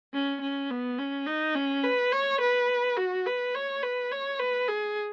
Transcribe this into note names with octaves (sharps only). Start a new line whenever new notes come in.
C#4
C#4
B3
C#4
D#4
C#4
B4
C#5
B4
F#4
B4
C#5
B4
C#5
B4
G#4